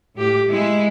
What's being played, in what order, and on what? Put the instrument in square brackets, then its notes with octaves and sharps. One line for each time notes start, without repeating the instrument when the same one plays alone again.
[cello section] A2 G4
G#3 E4